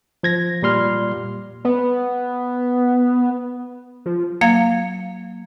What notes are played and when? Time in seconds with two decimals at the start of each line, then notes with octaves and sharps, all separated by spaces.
0.23 F3 G#6 A#6
0.62 A#2 G3 C6 F6
1.65 B3
4.06 F3
4.41 F#3 A#3 F5 G#6